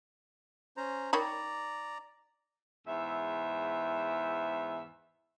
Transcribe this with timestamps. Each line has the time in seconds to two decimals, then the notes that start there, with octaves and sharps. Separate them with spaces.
0.77 C#4 C5 A#5
1.13 D#3 C#5 D5 A#5 B5
2.87 E2 G#2 E5